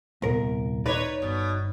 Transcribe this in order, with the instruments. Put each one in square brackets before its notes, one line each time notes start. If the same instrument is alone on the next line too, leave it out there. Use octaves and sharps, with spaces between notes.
[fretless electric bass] D#1 A#2 B3 [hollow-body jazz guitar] C2 A#4
[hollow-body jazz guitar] D#4 D5 [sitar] B4 C#5
[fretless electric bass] G1 [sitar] B2